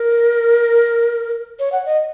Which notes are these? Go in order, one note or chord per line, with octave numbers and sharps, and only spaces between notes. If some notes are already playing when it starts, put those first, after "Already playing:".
Already playing: A#4
C#5
F#5
D#5